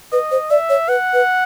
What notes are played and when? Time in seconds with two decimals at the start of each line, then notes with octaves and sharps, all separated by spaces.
0.12 B4 D#5
0.31 C5
0.50 D5 E5
0.69 C#5
0.88 B4 F#5
1.13 B4